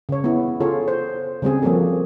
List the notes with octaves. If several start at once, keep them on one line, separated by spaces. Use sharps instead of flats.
C#3 C#5
B3 E4
C#3 F4 G#4 A4 C#5
C5
C#3 G3 C4 G#4
F3 A#3 C4 F#4 A4